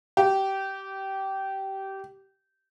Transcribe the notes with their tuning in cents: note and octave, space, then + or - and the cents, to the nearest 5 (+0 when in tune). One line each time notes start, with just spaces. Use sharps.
G4 -20